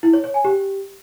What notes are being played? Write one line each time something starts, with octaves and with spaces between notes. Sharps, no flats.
E4
C#5
C#5
G#5
G4